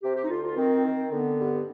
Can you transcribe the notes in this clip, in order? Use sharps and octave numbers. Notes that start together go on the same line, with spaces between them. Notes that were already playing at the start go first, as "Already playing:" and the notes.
C3 G4
G4
D#4
D2 F4
F4
D#3 C4
D#3
D3 B3
G2